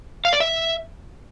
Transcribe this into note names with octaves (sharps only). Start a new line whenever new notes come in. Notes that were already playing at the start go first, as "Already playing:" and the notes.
F5
D5
E5